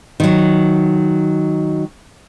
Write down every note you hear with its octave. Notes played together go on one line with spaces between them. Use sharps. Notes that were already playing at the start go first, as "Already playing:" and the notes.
D#3 F#3